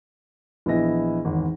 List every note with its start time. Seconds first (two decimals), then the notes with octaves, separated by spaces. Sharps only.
0.66 A#1 E3 B3 E4 D#5 A#6
1.25 G#1 E2